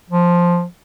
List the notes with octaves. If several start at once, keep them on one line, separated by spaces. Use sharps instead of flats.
F3